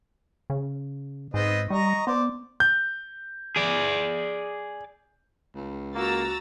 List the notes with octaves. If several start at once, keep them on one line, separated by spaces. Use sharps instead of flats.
C#3
G#2 B3 C4 D#5
G3 D#5 A#5 C#6
B3 C5 D5
G6
G#4 D5
C#2
A#3 F#4 A#5 E6 A6